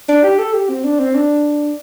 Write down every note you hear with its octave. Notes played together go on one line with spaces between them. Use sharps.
D4
G4
A4
G4
C4
D4
C4
D4